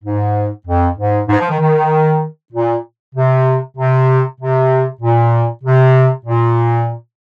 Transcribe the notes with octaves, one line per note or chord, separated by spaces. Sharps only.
G#2
F2
G#2
G#2
F3
D#3
D#3
A#2
C3
C3
C3
A#2
C3
A#2